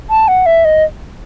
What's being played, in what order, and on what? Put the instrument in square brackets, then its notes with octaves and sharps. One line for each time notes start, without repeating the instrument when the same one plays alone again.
[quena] A5
F#5
E5
D#5